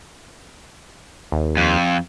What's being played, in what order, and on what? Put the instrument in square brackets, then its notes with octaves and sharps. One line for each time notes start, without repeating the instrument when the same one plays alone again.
[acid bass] D#2
[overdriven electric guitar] F2